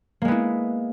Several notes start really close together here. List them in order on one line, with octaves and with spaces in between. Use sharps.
A#3 G#3 B3 E4